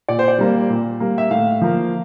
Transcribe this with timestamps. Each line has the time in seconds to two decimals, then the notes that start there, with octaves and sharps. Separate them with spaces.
0.09 A#2 D5
0.19 C5
0.28 D5
0.38 G3 A#3
0.70 A#2
1.00 G3 A#3
1.18 E5
1.30 A2 F5
1.61 F3 A#3